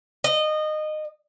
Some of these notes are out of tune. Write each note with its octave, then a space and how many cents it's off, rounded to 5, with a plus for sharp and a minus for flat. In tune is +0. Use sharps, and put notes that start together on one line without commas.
D#5 -20